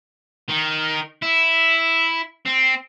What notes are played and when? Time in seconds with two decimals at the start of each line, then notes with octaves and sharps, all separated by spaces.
0.49 D#3
1.22 E4
2.46 C4